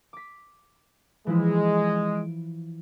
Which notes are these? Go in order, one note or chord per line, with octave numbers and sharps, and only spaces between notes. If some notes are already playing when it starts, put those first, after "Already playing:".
D6 B6
E3 F3 G#3 E4
D7